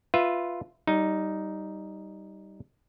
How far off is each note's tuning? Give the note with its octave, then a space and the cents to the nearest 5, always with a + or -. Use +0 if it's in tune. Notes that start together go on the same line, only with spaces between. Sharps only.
F4 +0 B4 +0 E5 +10
G3 -15 D#4 +0